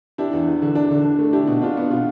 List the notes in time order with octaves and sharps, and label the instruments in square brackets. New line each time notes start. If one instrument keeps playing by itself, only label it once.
[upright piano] D4 E4 G4
E2
E2
D3
D4
D3
D4
A3
D4 E4 G4
B2
D4 F4
B3
B2 F4